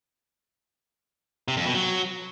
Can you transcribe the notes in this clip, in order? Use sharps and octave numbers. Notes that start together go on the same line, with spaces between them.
C3
F2
B2
F#3